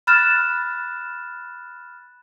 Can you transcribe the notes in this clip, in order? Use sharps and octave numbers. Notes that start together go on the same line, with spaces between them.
B5 F6 F#6 A6 E7